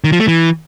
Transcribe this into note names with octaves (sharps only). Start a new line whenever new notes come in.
D#3
F3
A3
E3